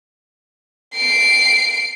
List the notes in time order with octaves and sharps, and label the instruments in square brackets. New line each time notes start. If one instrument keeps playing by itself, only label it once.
[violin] C7 D7